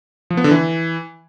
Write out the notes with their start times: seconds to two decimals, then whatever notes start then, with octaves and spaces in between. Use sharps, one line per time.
0.30 F3
0.37 B3
0.44 D3
0.51 E3